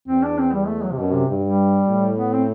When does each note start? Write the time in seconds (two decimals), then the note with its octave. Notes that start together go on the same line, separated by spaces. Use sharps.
0.08 E2 C4
0.23 D4
0.38 C4
0.52 G3
0.67 A3
0.83 F#3
0.92 C3
0.98 F#2 B2
1.13 C3
1.27 G2
1.43 G3
1.88 A2
2.18 B3
2.33 C4